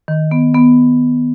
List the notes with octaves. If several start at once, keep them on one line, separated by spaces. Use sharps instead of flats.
D#3
B3
B3